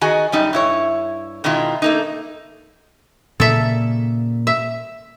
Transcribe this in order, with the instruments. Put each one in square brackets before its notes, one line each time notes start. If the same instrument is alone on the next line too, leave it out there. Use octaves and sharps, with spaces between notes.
[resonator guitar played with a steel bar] D#3 F#4 G#4 D#5 G#5
F#2 G3 D#4
G2 E4 C#5
B2 D#3 G#3 E4 F4
A3 A#3 D#4
[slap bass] A#2 C#3 A#3 [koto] A4 E5
[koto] E5